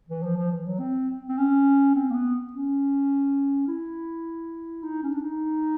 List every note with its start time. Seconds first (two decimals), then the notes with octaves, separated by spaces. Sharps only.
0.08 E3
0.23 F3
0.37 F3
0.51 E3
0.66 F#3
0.79 C4
1.29 C4
1.38 C#4
1.95 C4
2.10 A#3
2.14 B3
2.53 C#4
3.68 E4
4.83 D#4
5.03 C#4
5.12 D4
5.22 D#4